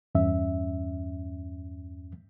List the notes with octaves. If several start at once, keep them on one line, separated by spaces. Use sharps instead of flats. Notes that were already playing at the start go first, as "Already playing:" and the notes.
E2 G2 C#4 E5